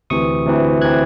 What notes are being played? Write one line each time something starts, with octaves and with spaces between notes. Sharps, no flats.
D2 C3 E3 C#6 D#6
D2 C3 E3
C3 E3 F#6 G#6